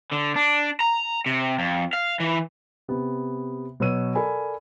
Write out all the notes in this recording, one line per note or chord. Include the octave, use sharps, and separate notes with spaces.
D3
D4
A#5
C3
F2
F5
E3
C3 B3
B2 F#3 B4 C#5 E6 D#7
A4 A#4 D5 G#5 B5